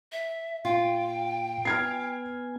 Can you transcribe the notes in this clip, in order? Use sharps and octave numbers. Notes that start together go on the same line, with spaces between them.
E5
A#2 F4 G5
B3 G#5 F6 G#6 C7